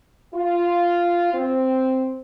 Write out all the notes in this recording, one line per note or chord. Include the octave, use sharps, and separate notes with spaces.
F4
C4